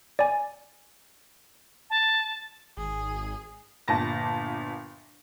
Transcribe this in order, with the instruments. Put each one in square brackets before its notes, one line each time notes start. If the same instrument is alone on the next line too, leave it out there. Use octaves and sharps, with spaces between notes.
[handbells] D5 G#5
[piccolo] A5
[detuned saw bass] G#1 [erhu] G#4
[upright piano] G1 A#2 A5 A#6